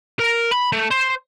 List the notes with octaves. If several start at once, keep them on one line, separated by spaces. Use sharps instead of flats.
A#4
B5
A3
C5